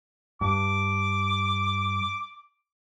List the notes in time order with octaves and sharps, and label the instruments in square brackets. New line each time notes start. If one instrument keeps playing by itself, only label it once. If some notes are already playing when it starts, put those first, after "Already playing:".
[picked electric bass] G2 [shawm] D6